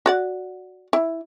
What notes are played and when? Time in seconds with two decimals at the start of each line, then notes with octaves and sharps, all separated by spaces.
0.06 F#4 D5 F#5
0.93 E4